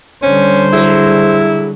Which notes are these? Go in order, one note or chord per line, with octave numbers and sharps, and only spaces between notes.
D3 G3 C#4 C5
F#3 E4 G#4